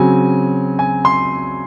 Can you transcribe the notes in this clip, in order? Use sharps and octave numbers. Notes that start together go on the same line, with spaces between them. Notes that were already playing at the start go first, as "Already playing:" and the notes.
Already playing: C#3 F#3 C4 G#5
G#5
C6